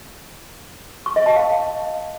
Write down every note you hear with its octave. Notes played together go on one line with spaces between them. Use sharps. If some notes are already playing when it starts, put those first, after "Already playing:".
C#6
D#5
A5
F5